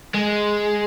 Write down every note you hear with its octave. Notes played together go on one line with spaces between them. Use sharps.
G#3